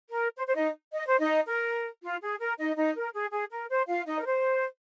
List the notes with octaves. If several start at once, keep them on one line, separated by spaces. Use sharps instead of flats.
A#4
C5
C5
D#4 D#5
D#5
C5
D#4 D#5
A#4
F4
G#4
A#4
D#4 D#5
D#4 D#5
A#4
G#4
G#4
A#4
C5
F4 F5
D#4 D#5
A#4
C5